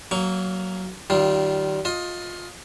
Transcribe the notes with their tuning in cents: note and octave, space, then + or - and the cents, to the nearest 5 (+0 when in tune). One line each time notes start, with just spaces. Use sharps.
F#3 +10 A#3 +0 C#6 +35
D#3 +0 G3 -30 F4 +0
F4 +20 D#5 +10